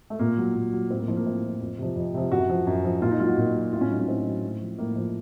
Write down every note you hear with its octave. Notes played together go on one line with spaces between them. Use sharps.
A3
A#2 A#3
F#3
A#2
F#3
A2 C4
A#3
F3 F4
A#3
A2 C4
F3
F2
C3 F3
F2
C3 F3
F#2 F#4
F3
F#2
F3
A#2 F4
D#4
F#3 F4
F#4
A#2
F#3
A2 F4
C#4
F#3 D#4
C#4
A2 C4
F#3
A2
F3
A2 A#3
F3